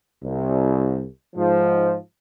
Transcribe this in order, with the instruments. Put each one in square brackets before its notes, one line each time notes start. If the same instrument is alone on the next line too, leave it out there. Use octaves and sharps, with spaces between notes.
[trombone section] C2
G#2 F3